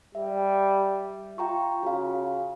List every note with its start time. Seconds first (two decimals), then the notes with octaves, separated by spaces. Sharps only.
0.15 G3 E5
1.38 F4 G5 A#5 C#6
1.83 C#3 F#4 F5